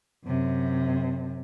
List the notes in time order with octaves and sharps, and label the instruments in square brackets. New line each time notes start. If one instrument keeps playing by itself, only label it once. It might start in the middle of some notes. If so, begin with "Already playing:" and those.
[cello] F#2 C3